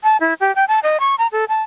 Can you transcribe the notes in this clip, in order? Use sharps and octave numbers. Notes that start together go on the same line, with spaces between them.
A5
E4
G4
G5
A5
D#5
C#6
A#5
A4
A5